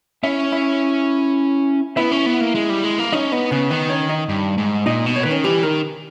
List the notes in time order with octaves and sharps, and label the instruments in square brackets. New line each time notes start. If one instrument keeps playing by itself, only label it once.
[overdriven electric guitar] C#4 [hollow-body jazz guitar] E4 E5
[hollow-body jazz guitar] E4 E5
[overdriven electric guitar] B3 [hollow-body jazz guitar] E4 E5
[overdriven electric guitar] C#4
B3
A#3
G#3
G3
G#3
A#3
[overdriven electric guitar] C#4 [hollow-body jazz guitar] D#4 D#5
[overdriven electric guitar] B3 [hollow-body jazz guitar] D#4 D#5
[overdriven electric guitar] C#3 [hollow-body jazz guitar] B3 B4
[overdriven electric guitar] D#3 [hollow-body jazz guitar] B3 B4
[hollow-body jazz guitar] C#4 C#5
D#4 D#5
[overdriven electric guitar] G2
G#2
[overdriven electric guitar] A#2 [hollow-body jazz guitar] D#4 D#5
[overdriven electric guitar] B2
[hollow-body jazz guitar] C#5
[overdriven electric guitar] D#3 [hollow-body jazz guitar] B4
[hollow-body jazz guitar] C#4 C#5
[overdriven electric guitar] E3 [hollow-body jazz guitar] G3 G4
[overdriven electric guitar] D#3 [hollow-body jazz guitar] A#4